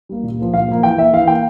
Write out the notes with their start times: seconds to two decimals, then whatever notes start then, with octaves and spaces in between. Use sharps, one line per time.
0.09 G3 A#3
0.23 A#2
0.39 F3 A#3
0.54 A#2 F5
0.68 F3 A#3
0.83 E3 G5
0.98 A#3 E5
1.13 E3 F5
1.27 A#3 G5